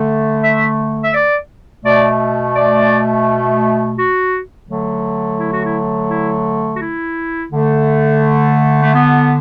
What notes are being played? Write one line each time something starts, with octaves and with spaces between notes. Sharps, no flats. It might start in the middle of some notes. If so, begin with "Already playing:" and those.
Already playing: D3 A3
E5
E5
D5
B2 A3 D5
D5
F#4
D3 F#3 A3
E4
F#4
E4
E4
F#4
E4
D3 A3
A3
B3